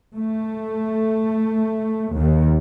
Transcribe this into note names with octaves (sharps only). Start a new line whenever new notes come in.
A3
D#2